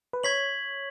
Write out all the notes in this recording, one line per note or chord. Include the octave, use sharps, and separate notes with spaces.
B4
C#5 C#6 G#6 B6 F#7